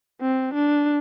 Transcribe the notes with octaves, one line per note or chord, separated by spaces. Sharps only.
C4
D4